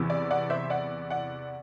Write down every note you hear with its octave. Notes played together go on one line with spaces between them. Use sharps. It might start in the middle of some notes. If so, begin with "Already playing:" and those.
Already playing: E2 C3 E3 B3
D5
D5 F#5
C5 E5
D5 F#5
D5 F#5